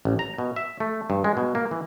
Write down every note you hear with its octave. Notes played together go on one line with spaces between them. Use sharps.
A1
A#5
B2
E5
A3
G2
G#3
B2
A#3
E3